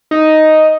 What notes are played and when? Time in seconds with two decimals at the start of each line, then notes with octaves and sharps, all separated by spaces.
0.11 D#4